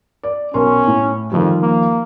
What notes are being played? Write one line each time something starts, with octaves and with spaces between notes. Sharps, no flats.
D5
B1 C#4 A#4 C6
A2
F2 D#3 F3 G3
A#3